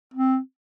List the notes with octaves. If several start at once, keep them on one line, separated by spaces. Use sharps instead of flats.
C4